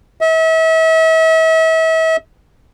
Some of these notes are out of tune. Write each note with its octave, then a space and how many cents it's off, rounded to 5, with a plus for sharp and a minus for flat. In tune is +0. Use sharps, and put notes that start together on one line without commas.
E5 -40